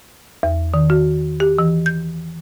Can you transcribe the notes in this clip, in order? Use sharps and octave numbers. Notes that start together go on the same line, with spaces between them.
E2
D#3
F#4
G4
E3
G6